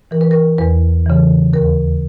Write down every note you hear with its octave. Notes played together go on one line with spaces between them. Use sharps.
E3 A#4
B4
A#4
E2 B4
C#3 E3
D#2 A#4